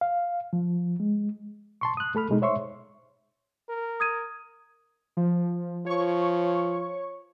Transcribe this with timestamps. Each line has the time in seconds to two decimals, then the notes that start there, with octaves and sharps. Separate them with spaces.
0.01 F5
0.53 F3
1.00 G#3
1.81 A5 C6 C#6
1.97 D#6 F#6
2.15 A3 A4 B5 F6
2.29 B2 G#3 D#4
2.42 C5 C#5 E5 C6 C#6
3.69 A#4
4.00 D#6 G#6 D#7
5.17 F3
5.86 F3 C#5 C#6